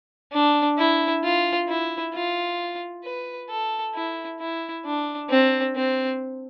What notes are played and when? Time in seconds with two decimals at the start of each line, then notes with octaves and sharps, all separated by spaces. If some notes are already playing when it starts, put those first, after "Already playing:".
0.33 D4
0.78 E4
1.23 F4
1.68 E4
2.14 F4
3.04 B4
3.50 A4
3.94 E4
4.40 E4
4.85 D4
5.30 C4
5.75 C4